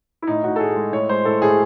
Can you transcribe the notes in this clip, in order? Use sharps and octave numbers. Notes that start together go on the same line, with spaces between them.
E4
A2 D#4
A2 F#4
A4
A2 G#4
G#3
A2 C#5
G#3 C5
A2 A4
A2 G#4